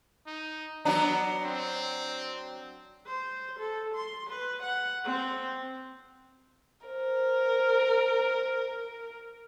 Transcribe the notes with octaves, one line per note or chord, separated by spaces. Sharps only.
D#4
F#3 B3 D4 A#5
C4
C5
A4
C6
B4
F#5
C4
A#4 C5